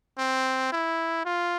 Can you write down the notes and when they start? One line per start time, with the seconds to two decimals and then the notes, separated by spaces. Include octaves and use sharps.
0.18 C4
0.72 E4
1.25 F4